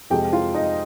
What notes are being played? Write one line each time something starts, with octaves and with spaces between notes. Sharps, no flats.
F2 C3 F3 G#3 G4 G5
F4 F5
D#4 D#5